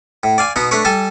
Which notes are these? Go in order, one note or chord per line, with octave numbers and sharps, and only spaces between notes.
A2
D5 F5 G#5
B2 B3 D#4
A3 D4 B4 C#5
G3 A4 G#5 A5